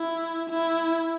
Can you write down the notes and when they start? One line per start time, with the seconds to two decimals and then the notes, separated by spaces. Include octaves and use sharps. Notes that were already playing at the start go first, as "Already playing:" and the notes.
Already playing: E4
0.49 E4